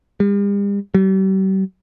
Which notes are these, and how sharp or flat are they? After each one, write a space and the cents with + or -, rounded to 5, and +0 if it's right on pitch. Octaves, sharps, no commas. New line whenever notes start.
G3 +45
G3 -40